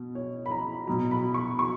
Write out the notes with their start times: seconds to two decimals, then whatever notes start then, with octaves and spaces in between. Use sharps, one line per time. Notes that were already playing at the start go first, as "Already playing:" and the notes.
Already playing: B2
0.15 C#5
0.46 B5
0.51 A#5
0.87 B2 F#3 A#5
1.11 B5
1.34 C#6
1.59 C#6